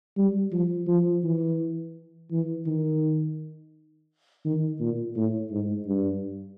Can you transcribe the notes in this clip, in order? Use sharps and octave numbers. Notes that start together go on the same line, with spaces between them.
G3
F3
F3
E3
E3
D#3
D#3
A#2
A2
G#2
G2